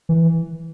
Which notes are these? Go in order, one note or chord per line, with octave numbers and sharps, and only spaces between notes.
E3